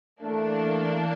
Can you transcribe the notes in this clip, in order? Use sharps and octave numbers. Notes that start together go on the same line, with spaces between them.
E3 A3 A#3 D4